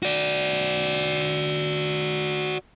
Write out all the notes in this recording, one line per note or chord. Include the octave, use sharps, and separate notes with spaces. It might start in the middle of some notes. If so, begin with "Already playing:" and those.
F#4 D5